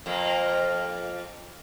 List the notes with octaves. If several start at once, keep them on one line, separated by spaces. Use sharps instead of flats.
F2 A#3